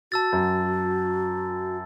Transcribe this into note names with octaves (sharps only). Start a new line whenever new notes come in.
F#4 A5 E6 A6
F#2